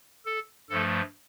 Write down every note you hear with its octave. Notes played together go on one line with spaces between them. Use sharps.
A4
G2 F3 A3 A4